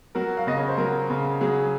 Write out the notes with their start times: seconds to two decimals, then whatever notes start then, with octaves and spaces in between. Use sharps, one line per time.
0.15 F#3 F#4 A#4
0.37 F5
0.47 C#3 D#5
0.57 C#5
0.68 C5
0.78 F#3 F#4 A#4
1.10 C#3
1.41 F#3 G#4